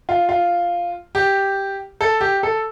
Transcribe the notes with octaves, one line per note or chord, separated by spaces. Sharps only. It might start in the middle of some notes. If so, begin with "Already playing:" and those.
F4
F4
G4
A4
G4
A4